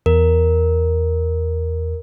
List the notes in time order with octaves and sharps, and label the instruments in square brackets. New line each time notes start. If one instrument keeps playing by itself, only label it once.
[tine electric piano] E2 [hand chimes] A#4